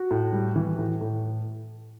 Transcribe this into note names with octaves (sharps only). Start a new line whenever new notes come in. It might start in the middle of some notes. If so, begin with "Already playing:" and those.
Already playing: F#4
A2
G3
E3
A2
A2